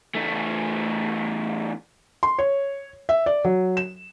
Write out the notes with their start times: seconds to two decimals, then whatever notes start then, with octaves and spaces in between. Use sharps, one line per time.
0.15 E2 A3
2.23 C6
2.39 C#5
3.09 E5
3.26 D5
3.45 F#3
3.77 E7